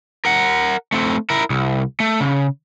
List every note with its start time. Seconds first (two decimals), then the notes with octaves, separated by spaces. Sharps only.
0.25 A#4 F#5
0.92 A3 C4
1.30 E4 A#4
1.50 C2
2.00 A3
2.20 C#3